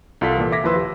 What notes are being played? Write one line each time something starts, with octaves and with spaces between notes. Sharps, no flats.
C2 F4 A4 B6
A#2 E3
E5 D6 G#6 A#6 B6
D#2 F3 E4 B4 C6 E6
G4